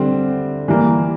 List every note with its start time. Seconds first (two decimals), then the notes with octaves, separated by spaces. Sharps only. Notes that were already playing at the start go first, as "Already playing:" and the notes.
Already playing: D3 G3 C4
0.68 E3 G3 A#3